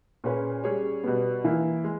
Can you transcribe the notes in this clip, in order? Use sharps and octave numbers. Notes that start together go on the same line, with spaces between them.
A#2 A#3 C#4 G#4 B4
G3 C#4 G#4 C#5
B2 G3 B3
E3 A#3 E4
G#3